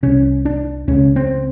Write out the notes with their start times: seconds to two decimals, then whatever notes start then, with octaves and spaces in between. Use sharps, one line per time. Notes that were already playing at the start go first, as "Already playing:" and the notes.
0.03 C2 C3 C#4
0.45 D4
0.88 C#2 C#3 C#4
1.16 C4